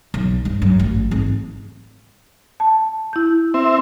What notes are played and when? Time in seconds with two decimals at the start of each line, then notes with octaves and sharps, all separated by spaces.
0.14 B1
0.45 G2
0.62 F#2
0.79 A1
1.11 G#1
2.60 A5
3.13 E4 G6
3.54 C4 E5